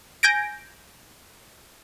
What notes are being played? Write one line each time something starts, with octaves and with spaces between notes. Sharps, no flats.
G#5 G6 G#6 A#6 D7